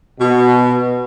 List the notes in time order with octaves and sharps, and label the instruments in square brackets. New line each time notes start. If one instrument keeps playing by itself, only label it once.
[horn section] B2